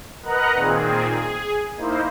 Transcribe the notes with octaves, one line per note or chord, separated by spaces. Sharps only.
A#4 B4 D#5 F#5 A#5 F#6
A#2 D#3 C4 G#4
G#4
A#3 D#4 E4 C5